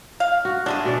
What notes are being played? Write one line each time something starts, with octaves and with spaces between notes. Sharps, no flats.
F5
F#4
G#3 A3 D4 G#4
B2 D4 D5